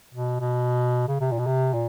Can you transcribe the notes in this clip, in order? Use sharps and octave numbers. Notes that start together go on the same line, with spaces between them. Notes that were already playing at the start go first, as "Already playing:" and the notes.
B2
B2
C#3
C3
A#2
B2
C3
A#2